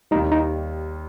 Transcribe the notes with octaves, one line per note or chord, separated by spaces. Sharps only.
D#2 D#3 G3 D#4
D#4